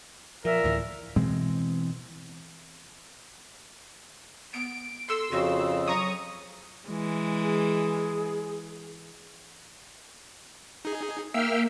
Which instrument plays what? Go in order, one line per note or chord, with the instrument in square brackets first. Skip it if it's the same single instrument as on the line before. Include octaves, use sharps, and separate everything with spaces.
[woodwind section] A#2 A#4 E5 [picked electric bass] F3
[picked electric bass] D2 A2 E3
[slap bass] B2 E3 G#3 C4
[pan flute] B3 [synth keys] D7
[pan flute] A4 [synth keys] C6 E6
[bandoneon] F2 C#3 [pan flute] F#4
[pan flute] F#3 [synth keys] A#5 C#6 D#6
[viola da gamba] E3 G#3
[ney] G#4
[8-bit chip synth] D#4 G#4
[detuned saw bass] A#3 [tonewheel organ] E5 F5 G5 [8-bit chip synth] E6 F6